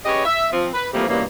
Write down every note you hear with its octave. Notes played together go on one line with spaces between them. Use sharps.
C#4 G4 G#4 B4 C#5 D#5
E5
F3 C4
B4
E3 F3 G3 A3 A#3 C4
G2 B2 E3 G3 A#3 C#4